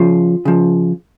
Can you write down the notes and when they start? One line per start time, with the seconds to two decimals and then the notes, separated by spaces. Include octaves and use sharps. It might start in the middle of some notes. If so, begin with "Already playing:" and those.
Already playing: C#3 F3 F4
0.45 C#3 F3